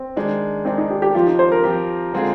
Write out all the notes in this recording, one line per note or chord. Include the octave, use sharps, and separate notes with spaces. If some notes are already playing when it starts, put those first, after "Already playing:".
Already playing: C4
D#3 G#3 D4
D#3 G#3 C4 D4
D#4
G4
G4
F3 C4 F4 G4
D#4
C5
A#4
F3 C4 G4
D3 G#3 C4 F4 G#4